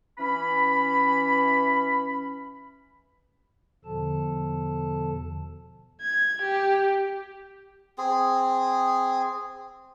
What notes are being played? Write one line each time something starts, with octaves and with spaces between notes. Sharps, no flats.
E3 C#4 B5
E2 B2 D3 F3 A4 A5
G#6
G4
C4 G#4